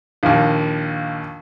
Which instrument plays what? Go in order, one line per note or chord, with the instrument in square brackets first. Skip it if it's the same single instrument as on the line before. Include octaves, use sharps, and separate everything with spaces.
[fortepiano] A#1 D#2